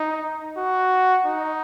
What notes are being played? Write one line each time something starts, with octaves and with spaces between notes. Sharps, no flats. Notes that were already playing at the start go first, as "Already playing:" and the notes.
Already playing: D#4
F#4
D#4